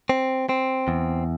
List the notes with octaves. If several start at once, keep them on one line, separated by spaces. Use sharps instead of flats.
C4
C4
E2